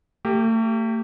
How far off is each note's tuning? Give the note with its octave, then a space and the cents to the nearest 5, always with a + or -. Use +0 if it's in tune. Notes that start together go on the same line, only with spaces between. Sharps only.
A3 +40 G4 +0